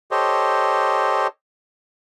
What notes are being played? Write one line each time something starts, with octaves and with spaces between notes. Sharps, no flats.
G4 A4 C5 C#5 D#5